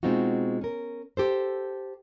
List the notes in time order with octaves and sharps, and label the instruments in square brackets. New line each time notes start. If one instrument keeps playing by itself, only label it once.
[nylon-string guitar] B2 G#3 C4 D#4 F4 F#4
C#4 A#4
G4 A4 C5